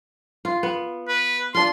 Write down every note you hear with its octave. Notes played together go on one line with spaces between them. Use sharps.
F4
B3
B4
D4 F4 C6